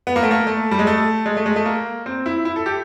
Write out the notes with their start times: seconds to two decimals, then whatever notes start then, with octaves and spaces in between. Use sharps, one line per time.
0.07 B3
0.16 A#3
0.23 A3
0.31 A#3
0.47 A3
0.71 G3
0.79 G#3
0.87 A3
1.26 G#3
1.37 A3
1.46 G#3
1.56 A3
1.65 A#3
2.06 C4
2.26 E4
2.45 E4
2.56 A4
2.66 G4